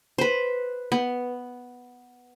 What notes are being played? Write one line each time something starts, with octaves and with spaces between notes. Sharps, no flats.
B4 C5
B3